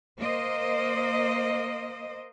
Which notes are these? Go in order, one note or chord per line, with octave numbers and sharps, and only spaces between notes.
A#3 C5 D#5